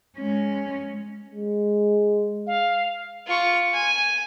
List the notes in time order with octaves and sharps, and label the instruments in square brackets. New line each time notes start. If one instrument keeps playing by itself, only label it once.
[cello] G#3 C#4
[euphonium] G#3
[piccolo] F5
[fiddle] F4 C#6
G#5